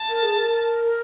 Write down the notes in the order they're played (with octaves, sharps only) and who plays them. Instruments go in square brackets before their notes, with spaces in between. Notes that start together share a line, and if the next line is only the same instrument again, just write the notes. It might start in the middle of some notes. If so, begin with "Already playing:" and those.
Already playing: [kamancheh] A5
[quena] A#4
G#4
A#4